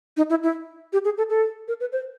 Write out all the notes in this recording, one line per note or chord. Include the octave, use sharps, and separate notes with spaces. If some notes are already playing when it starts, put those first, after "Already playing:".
D#4
E4
E4
G4
G#4
A4
A4
A#4
B4
C5